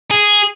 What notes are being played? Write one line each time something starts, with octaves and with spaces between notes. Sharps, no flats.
G#4